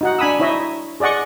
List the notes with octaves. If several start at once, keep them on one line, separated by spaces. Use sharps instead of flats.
D#4 F#4 F#5
D4 G#5 B5 D#6 E6
D#4 E4 C#5 D#5 E5
G#4 D5 D#5 F#5 C#6